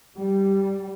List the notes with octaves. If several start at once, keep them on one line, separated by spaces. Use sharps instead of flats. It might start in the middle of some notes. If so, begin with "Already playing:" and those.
G3